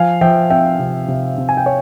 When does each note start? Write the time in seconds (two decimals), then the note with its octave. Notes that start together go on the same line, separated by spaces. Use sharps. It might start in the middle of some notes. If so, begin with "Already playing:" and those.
Already playing: F3 F5 G#5
0.21 F3 E5 G5
0.50 C4 E5 G5
0.79 C3
1.08 C3
1.38 C3
1.49 G#5
1.57 G5
1.66 C#5